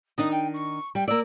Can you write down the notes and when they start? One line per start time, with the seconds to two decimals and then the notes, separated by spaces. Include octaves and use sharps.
0.18 D#3 D4 D#4 D#6
0.31 G5
0.54 C#6
0.95 G3 G5
1.08 A#3 D5 E6